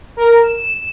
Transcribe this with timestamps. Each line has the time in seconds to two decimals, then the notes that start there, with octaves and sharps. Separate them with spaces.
0.17 A#4
0.43 E7